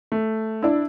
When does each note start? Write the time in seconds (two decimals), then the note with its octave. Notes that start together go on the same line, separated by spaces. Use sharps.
0.12 A3
0.62 D4 E4